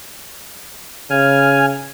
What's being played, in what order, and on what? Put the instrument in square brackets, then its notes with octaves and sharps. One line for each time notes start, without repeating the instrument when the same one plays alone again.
[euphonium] C#3 [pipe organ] G#5 F6